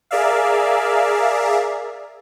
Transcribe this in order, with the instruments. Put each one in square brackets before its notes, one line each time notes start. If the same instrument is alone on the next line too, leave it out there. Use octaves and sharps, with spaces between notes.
[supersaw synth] G#4 A#4 D5 E5 F5